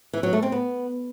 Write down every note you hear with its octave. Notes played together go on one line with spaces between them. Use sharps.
E3
F#3
A3
C4
B3